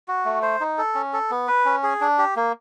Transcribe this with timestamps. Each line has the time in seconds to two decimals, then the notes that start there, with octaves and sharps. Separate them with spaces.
0.08 F#4
0.25 A3
0.42 C5
0.60 D#4
0.78 A4
0.95 C#4
1.13 A4
1.30 B3
1.48 B4
1.65 C#4
1.83 G#4
2.01 D4
2.18 G4
2.36 A#3